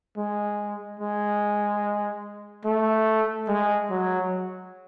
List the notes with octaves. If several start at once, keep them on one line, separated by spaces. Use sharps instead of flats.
G#3
G#3
A3
G#3
F#3